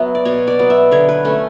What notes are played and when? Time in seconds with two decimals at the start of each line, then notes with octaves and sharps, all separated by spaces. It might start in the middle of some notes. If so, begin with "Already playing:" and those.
Already playing: F#3 B3 E5
0.15 D5
0.25 B2 C#5
0.47 D5
0.59 F#3 B3
0.70 E5
0.91 D3 C#5
1.09 B4
1.25 A3 C#4